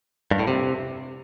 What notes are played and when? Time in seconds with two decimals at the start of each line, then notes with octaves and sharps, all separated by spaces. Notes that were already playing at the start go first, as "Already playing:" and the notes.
0.31 G2
0.39 A2
0.48 C3